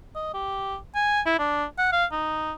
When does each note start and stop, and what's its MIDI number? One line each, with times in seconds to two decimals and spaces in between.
0.15 0.33 75
0.34 0.77 67
0.95 1.21 80
1.26 1.39 64
1.39 1.64 62
1.78 1.90 78
1.92 2.05 77
2.12 2.52 63